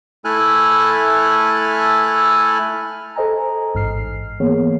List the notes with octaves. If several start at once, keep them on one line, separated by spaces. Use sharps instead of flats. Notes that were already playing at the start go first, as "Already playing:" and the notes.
A3 E4 A4 G#5 F6 F#6
A4 C5 D#5 G#5 A#5
A1 G#2 F6 C7
E3 A#3 B3 G#4 C#5